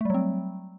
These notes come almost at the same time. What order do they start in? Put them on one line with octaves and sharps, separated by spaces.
A3 G3 F#3 C4